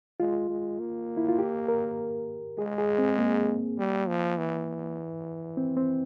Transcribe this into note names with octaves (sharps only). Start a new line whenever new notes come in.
G#3 F4
G#3
A#3
E4
F4
G4
A#4
G#3 G#4
G#4
C4
A#3
G3
F3
E3
C4
C4